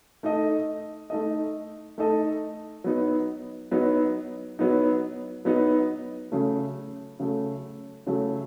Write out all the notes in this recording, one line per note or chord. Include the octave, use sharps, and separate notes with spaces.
A3 D#4 A4 D#5
A3 D#4 A4 D#5
A3 D#4 A4 D#5
F#3 B3 D#4
F#3 B3 D#4
F#3 B3 D#4
F#3 B3 D#4
C#3 F#3 A3
C#3 F#3 A3
C#3 F#3 A3